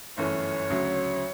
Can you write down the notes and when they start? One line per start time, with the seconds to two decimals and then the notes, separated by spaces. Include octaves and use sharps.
0.17 G1 F#2 E3 A3 C#5
0.70 D2 C#3 F#3